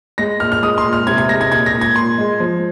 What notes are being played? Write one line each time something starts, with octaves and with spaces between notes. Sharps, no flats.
G#3 A#6
A#2 F6
F6
G#3 D#6
C6
A#2
F6
C3 G#6
G#6
G#3 A#6
G#6
A#2 G#6
A#6
A#2
G#6
A#2 C6
G#3
F3